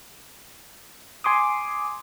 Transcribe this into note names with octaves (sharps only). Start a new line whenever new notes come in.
G#5 C6 D6 D#6